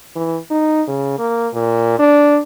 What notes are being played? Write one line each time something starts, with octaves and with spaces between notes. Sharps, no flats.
E3
D#4
C#3
A#3
A#2
D4